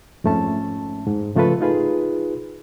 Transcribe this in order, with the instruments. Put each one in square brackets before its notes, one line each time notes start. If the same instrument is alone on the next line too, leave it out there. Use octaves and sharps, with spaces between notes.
[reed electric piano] F2 G#2 A3 C#4 A5
G#2
C#3 F3 A3 F4 A4 B4
D#4 F4 G#4 B4